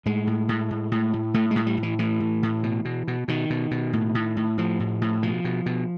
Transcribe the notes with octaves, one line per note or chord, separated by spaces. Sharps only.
A2 G#3
A2
A2
A2
A2
A2
A2 A3
A2 G#3
G3
A2
E3
A2 E3
A2
A2
B2
B2
B2
B2 D#3
B2
B2
A2
A2
A2
A2 F3
A2
A2
B2 F3
B2
B2